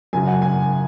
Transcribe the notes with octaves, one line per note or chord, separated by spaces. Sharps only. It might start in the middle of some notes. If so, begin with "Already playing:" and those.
F#2 C#3 F#3 G#5
F#5
G#5